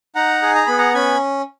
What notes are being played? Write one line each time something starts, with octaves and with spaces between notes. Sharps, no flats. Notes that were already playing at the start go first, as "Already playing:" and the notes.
D#4 F#5 A#5
G#4
A#5
B3 B5
F#5 A#5
C#4 G#5 B5